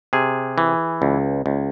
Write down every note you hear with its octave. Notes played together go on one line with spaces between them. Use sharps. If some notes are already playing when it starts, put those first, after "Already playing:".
C3 G#4
E3
C#2
C#2